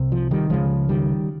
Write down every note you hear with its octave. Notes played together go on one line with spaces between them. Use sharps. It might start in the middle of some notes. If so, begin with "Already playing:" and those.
Already playing: C2 C3
F3
D#3 G3
C#2 C#3 F3 G#3
D#3 G3